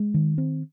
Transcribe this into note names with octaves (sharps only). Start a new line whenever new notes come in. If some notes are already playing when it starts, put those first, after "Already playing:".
Already playing: G#3
D#3
C4